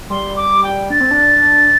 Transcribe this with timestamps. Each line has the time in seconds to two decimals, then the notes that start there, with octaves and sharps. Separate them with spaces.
0.10 G3 C6
0.36 D6
0.63 G5
0.90 D4 A6
1.00 C4
1.11 D4